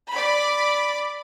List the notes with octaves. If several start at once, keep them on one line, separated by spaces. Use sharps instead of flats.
D5 B5